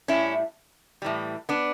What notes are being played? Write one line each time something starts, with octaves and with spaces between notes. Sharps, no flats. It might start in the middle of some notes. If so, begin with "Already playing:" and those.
A2 G3 C#4 E4
A2 E3 G3
B3 D4